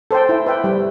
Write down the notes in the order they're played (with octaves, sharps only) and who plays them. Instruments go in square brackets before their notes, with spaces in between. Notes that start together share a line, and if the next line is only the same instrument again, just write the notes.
[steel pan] A4 C5 G5
E4
B4 E5 G5
G3